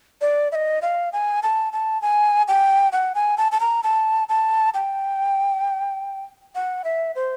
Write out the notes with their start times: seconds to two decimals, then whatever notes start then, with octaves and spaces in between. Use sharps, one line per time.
0.21 D5
0.52 E5
0.55 D#5
0.82 F5
1.13 G#5
1.43 A5
1.73 A5
2.02 G#5
2.48 G5
2.92 F#5
3.15 G#5
3.38 A5
3.52 A5
3.60 A#5
3.83 A5
4.29 A5
4.74 G5
6.55 F#5
6.84 E5
7.15 C5